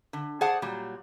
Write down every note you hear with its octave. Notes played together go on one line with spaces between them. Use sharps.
D3
G#4 C5 D5 F#5 A5
A#2 F#3 G3